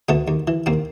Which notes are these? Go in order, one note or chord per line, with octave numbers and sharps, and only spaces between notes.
D2 A3 B3
D#2
E3
D#2 A#3 C4